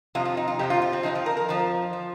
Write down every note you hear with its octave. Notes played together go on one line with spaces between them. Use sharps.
F2 C3 F3 F4
F4
D#4
F4
F2 C3 F3 G4
F4
F4
C4
F2 C3 F3 D#4
F4
A#4
A#4
F2 F3 F4
F3